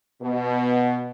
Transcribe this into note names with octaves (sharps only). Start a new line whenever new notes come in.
B2